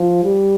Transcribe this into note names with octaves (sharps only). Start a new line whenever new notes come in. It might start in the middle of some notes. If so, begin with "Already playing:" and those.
Already playing: F3
G3